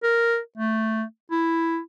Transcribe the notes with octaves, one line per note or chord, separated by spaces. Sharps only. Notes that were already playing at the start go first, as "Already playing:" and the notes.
A#4
A3
E4